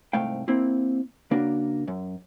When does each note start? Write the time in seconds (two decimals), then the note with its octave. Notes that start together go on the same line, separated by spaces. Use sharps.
0.13 C2 G#2 A3 F5 G5
0.48 A#3 C4 E4
1.31 C#3 A#3 D4 F#4 A#4
1.88 F#2